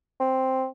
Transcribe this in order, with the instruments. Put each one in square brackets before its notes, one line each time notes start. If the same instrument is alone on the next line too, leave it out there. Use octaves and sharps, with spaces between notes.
[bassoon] C4